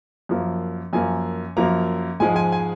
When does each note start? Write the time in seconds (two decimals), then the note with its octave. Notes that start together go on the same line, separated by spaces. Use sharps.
0.29 F#2 F3 A#3
0.93 F#2 F3 A#3 G#5
1.57 F#2 F3 A#3 A#5
2.20 G#2 F3 G#3 G#5
2.36 G#5
2.52 G#5